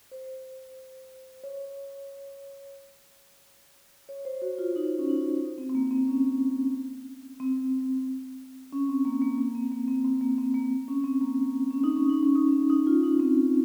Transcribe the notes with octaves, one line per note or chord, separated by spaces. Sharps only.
C5
C#5
C#5
C5
F#4
F4
D#4
C#4
D#4
C4
C4
A#3
C4
C#4
C4
C#4
C4
A#3
A#3
A#3
C4
A#3
C4
C4
A#3
C4
A#3
C#4
C4
A#3
C#4
D#4
C#4
D#4
C#4
D#4
C#4
D#4
F4
D#4
C4